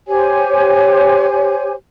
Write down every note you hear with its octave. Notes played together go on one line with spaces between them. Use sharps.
G4 C5 C#5 G#5